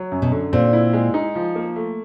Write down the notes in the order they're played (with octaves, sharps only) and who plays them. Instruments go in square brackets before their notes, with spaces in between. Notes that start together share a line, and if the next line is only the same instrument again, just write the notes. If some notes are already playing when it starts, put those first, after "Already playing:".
Already playing: [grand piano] F#3
F#2
[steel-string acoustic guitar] B2
[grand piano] D3
[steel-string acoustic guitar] A#2 [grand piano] C4
[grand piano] E4
G#3
D#4
F3
A#3
A3